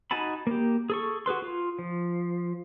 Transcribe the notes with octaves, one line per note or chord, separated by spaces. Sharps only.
D#4 F#4 G#5 A5 B5
A#3 G4
G#4 A4 C#6
F#4 G#4 B4 C6
F4
F3